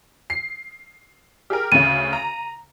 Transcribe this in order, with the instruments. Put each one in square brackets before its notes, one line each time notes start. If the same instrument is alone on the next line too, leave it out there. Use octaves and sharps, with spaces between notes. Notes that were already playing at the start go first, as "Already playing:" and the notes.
[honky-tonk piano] C7
G4 G#4 A#4
[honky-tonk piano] D2 C#3 [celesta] D#7
[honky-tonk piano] A#5